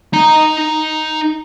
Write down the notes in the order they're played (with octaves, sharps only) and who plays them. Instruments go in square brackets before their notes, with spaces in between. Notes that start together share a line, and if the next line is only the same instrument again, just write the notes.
[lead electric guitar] D#4 A#5